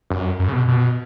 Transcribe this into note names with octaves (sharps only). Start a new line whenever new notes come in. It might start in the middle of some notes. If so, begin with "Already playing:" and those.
F#2
F#2
C#3
B2
B2